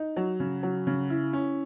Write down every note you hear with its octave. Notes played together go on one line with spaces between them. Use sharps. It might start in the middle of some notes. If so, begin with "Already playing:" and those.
Already playing: D#4
F#3
C#3
F#3
C#3
E4
C#4